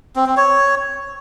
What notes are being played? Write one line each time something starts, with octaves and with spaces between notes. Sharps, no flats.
C4
C4
C#5